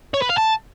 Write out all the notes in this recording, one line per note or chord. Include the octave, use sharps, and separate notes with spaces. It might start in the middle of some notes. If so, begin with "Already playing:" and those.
C#5
B4
F5
A5